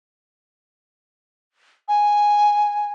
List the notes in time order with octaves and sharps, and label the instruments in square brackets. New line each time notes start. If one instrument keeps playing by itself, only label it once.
[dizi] G#5